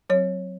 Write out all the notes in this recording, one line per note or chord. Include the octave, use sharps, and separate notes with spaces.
F#3 C4 C#5